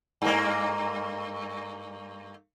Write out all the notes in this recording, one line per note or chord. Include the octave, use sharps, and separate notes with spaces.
G2 A#3